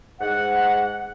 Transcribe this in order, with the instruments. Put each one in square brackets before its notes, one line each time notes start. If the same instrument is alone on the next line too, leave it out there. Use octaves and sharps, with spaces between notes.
[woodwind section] G#2 F#5